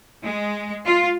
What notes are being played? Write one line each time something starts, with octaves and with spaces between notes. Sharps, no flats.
G#3
F4